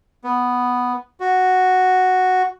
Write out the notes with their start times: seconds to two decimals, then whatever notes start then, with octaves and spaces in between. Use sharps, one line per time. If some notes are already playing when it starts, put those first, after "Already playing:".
0.24 B3
1.20 F#4